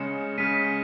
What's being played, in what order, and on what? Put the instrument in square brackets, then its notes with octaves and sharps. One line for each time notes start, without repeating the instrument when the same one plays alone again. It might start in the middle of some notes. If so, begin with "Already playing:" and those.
Already playing: [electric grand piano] C#3 G#3 C#4 [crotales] C#7 E7
[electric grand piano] C#3 G#3 C#4 [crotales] B6 D#7
[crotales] B6